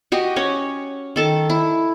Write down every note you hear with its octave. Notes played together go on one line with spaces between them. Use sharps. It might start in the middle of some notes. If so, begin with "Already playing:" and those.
F#4 G4 D#5
C#4 C#5
D#3 A4 A5
E4